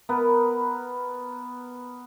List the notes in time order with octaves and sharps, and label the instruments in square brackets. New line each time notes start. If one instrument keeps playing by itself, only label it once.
[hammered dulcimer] B3 A#4 B4